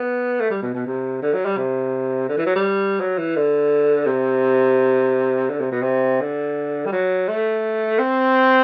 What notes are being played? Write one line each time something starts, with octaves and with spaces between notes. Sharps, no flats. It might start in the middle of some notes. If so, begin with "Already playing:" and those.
Already playing: B3
A3
G3
B2
B2
C3
D3
F#3
G3
C3
D3
E3
F#3
G3
F#3
E3
D3
C3
D3
C3
B2
C3
D3
G3
F#3
A3
C4